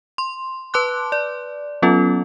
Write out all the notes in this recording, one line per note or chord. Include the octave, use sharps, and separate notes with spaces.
C6
B4 A5 C6 D6 F#6
D5
F#3 B3 C#4 F4 A4